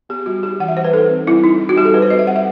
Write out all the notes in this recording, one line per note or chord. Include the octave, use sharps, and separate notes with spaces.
B3 G4
G3 F#4
D#4 G4
E3 F#5
E5
G3 C5
B4
D#4 A4
C4
G3 E4
D#4
D#4
F#4
G3 G4
A4
G3 B4
C5
C4 D#5
E5
G3 F#5
E5